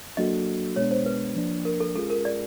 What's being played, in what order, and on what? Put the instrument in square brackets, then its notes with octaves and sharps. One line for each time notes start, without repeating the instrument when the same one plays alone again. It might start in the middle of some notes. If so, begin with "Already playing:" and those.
[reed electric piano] F#3 A#3 D4 F#4 A4 [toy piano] D#5
[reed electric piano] B2 G#3 B3 D4 [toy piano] C#5
[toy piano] C5
B4
[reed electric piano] F3 A#3 D4
[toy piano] A#4
A4
[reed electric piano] G#3 C#4 F4 G#4 [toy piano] A4
[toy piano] A#4
D5